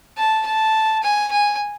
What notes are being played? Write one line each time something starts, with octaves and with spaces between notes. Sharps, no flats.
A5
A5
G#5
G#5